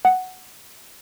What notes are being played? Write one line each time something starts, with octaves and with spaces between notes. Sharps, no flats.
F#5